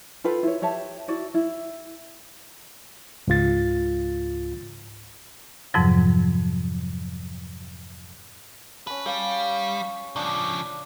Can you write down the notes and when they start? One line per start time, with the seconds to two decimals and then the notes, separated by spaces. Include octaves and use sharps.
0.24 F4 A4 B4 G5
0.43 E4 C#5
0.62 G4 C#5 E5 A5
1.08 E4 F#4 D5
1.34 E4
3.28 C#2 G#2 F4 A6
5.74 F2 G#2 C3 F3 F#3
8.87 C#4 B4 A5
9.06 G3 C#5 F5
10.16 C#3 F3 D4